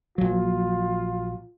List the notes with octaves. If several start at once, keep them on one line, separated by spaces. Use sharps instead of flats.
A#1 F#3 F4